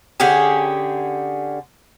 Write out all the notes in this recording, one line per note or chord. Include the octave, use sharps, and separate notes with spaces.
D3 C#4 G4 G#4